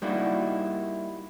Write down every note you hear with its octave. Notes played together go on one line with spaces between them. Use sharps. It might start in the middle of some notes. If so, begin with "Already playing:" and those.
G3 A#3 D#4 E4 F#4